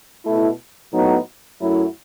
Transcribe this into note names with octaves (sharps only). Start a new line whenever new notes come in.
B2 A3 E4
A2 F#3 B3 D#4 F#4
F#2 F#3 A3 E4